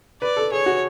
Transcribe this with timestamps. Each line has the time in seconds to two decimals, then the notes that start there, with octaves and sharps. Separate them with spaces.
0.22 B4 D5
0.37 A4
0.52 G#4 C#5
0.66 F#4